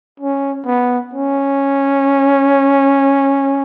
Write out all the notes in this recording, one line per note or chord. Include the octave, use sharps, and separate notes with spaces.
C#4
B3
C#4